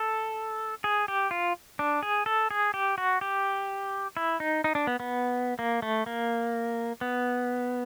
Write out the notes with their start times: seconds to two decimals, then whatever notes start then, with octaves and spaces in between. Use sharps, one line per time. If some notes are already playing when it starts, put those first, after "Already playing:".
Already playing: A4
0.84 G#4
1.08 G4
1.31 F4
1.79 D4
2.03 G#4
2.26 A4
2.51 G#4
2.74 G4
2.98 F#4
3.21 G4
4.17 E4
4.40 D#4
4.64 D#4
4.75 D4
4.87 B3
5.00 B3
5.59 A#3
5.82 A3
6.06 A#3
7.01 B3